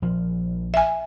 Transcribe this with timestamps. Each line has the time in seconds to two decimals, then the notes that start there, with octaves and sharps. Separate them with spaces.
0.02 A#1 F3
0.74 E5 G#5